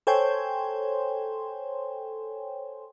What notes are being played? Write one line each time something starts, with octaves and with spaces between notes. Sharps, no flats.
A4 C5 C#5 G5 G#5 C6